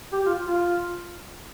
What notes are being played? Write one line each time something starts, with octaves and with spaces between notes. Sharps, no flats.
G4
F4
F4